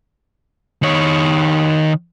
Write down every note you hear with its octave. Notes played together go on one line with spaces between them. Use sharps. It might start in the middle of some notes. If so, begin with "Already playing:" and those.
D#3 C#5